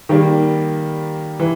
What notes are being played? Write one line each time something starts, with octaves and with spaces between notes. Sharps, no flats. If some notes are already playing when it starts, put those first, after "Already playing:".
D#3 G3 A#3
E3